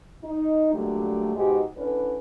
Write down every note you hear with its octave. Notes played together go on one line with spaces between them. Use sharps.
D#4
A#2 D3 F#3 G3 A3
G#2 B2 G#3 D#4 F#4 G4
D3 C#4 E4 B4